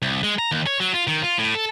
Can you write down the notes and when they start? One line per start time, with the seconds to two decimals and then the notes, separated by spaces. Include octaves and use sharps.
0.02 C2
0.23 G#3
0.39 A#5
0.52 D#2
0.66 C#5
0.80 F#3
0.94 F4
1.07 D#3
1.23 F4
1.38 A2
1.55 A4